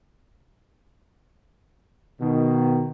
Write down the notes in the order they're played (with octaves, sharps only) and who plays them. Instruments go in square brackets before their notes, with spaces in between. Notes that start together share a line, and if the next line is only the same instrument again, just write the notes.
[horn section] B2 D#3